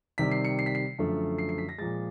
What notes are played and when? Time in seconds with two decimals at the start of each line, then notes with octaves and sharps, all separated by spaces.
0.18 C3 D#3 G3 B6
0.31 C7
0.45 C#7
0.59 C7
0.66 B6
0.75 C7
0.99 F#2 D3 F3 A3
1.38 C7
1.49 C7
1.58 B6
1.69 A#6
1.78 A#2 F3 G#3 A6